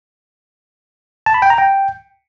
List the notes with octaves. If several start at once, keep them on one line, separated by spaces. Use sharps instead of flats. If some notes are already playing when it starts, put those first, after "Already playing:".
A5
B5
G5
A#5
G5